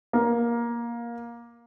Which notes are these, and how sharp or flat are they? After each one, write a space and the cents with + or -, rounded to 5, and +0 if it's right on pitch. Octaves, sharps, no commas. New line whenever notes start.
A#3 +15